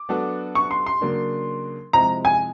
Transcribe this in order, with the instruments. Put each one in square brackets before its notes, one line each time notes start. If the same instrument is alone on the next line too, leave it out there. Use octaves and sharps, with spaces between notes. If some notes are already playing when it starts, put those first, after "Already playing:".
Already playing: [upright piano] D6
[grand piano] F#3 B3 D4 F#4 A4
[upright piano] C#6
C6
C6
[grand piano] C#3 F#3 A#3 D4
[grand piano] C3 F3 G#3 C4 E4 [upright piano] A#5
[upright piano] G#5